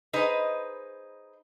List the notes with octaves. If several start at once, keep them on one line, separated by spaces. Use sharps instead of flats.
D#4 G#4 B4 C5 D#5